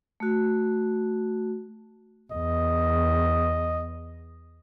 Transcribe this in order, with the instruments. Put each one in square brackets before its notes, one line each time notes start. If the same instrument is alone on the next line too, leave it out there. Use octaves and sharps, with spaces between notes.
[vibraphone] A3 F#4
[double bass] E2 [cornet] D#5